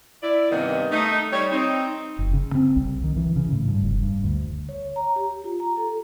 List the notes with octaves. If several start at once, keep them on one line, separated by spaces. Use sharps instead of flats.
E4 D5
G2 C3 D#3 A#3 B3 D#5
A3 D#4
G3 C#5
C4 D#4
F#1
C#3
C4
C2
D#3
E3
C#3
A2
G2
F1
G2
D2
C#5
A#5
G4
F4
A#5
A4